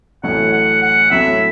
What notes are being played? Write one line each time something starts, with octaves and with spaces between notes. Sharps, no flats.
A1 A2 F#3 A3 C#4 F#5
F#5
F#5
A2 F#3 C#4 E5